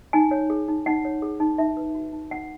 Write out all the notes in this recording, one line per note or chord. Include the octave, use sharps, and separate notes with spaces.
D#4 G#5
C#5
G#4
D#4
D#4 F#5
C#5
G#4
D#4
D#4 E5
B4
F#4
D#4
D#4 F#5